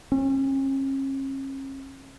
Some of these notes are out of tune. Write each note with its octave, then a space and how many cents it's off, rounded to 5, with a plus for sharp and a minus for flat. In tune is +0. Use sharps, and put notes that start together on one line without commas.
C#4 -40